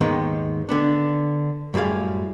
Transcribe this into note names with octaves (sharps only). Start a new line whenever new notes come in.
D#2 G#2 D#3 G#3 B3
D3 B3 D4
F#2 A2 G3 G#4 F5